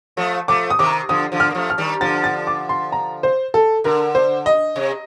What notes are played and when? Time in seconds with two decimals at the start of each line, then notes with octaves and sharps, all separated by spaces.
0.17 F3 A3
0.48 F3 A3 D6
0.70 D#6
0.79 C3 D#3 D6
1.09 D3 F3 D#6
1.32 D3 F3
1.40 F6
1.50 A#3
1.55 F3 A3
1.70 F6
1.78 D#3 G3
2.01 D3 F3 A6
2.24 A6
2.47 D6
2.69 C6
2.92 A#5
3.23 C5
3.54 A4
3.84 D3 A#4
4.15 C5
4.46 D#5
4.76 C3